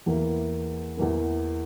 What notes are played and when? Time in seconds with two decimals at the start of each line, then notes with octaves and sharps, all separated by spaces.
0.06 E2 E3 A#3
0.97 E2 E3 A#3